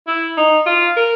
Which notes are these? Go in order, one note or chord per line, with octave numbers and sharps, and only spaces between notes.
E4
D#4
F4
A#4